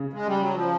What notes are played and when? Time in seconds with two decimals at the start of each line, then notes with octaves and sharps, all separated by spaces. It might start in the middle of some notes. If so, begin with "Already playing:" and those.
Already playing: C#3
0.13 G#3
0.27 G3
0.41 F#3
0.54 F3